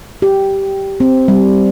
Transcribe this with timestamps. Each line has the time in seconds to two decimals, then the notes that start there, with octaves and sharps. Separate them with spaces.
0.22 G4
1.00 C4
1.28 G3